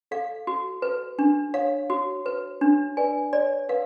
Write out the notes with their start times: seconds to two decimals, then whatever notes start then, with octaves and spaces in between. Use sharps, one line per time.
0.11 A4 F5
0.47 F#4
0.82 B4
1.19 D4
1.54 C#5 F5
1.90 F#4
2.26 B4
2.61 D4
2.97 B4 D5 G#5
3.33 C#5 D5
3.69 B4 F5